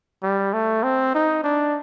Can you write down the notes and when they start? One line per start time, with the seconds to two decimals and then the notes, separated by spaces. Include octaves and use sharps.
0.23 G3
0.53 A3
0.84 C4
1.14 D#4
1.44 D4